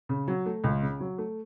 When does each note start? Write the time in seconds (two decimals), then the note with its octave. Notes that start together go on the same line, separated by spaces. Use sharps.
0.09 C#3
0.28 F#3
0.46 A3
0.64 C#2
0.82 C#3
1.00 F#3
1.18 A3